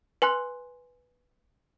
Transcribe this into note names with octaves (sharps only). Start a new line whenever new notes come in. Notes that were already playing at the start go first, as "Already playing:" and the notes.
B4 G#5 C6 F#6